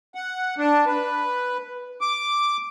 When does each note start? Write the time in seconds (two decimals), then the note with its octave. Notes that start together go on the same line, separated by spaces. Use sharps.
0.15 F#5
0.58 D4
0.87 B4
2.01 D6